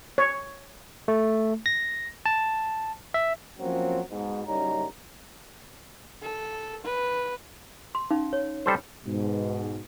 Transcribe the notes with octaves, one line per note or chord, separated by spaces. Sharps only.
C#5
A3
A#6
A5
E5
F3 F#3 A#3 C4 C#4
G#2 B2
F#1 F#2 G3 C#4 D#4 A#5
A4
B4
C6
C#4 D#4 F5
C#5
G3 A4 C5
G#2 B2